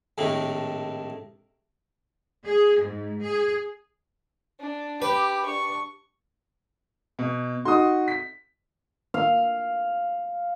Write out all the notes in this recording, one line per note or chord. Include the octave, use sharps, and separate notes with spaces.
A#1 A2 C3 D#3 A3
G#4
G#2
G#4
D4
G4 B4 B5 D6
D4 C#6
B2
D#4 F#4 C6 D#6
B6
F5